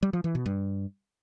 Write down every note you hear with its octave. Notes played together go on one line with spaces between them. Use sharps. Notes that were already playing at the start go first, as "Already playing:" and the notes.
G3
F3
E3
B2
G2